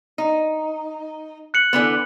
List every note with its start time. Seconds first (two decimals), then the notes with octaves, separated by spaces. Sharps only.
0.18 D#4
1.54 F#6 C#7 F#7
1.73 D3 E3 B3